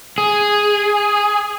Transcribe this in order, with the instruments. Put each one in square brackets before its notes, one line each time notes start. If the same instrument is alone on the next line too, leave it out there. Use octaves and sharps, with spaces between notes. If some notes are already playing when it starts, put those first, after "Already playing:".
[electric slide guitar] G#4